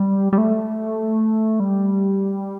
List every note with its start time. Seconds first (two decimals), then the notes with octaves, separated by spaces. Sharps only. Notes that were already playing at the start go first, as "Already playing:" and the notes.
Already playing: G3
0.33 G3
0.38 A3
1.60 G3